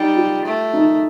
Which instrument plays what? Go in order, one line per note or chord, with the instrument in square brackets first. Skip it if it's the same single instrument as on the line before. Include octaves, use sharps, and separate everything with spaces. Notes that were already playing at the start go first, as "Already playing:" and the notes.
Already playing: [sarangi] G3 [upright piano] D#4
[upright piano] F4
[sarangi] A3
[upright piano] D#4